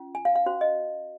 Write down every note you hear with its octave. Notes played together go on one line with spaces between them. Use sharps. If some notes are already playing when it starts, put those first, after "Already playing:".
Already playing: C#4 F4
G#5
F5
F5
C#4 F#4 C5
D#5